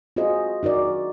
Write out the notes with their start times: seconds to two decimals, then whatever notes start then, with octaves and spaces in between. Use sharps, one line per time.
0.16 F4 F#4 G#4 C5 D#5
0.63 D#4 F#4 A#4 D5